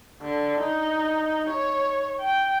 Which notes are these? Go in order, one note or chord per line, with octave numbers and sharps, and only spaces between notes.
D3
D#4
C#5
G5